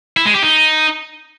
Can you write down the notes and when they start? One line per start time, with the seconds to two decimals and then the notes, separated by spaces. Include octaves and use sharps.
0.17 E4
0.25 G#3
0.34 G4
0.43 D#4